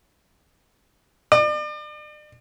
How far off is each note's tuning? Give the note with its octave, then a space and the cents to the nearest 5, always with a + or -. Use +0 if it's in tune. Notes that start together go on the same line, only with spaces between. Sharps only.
D5 +40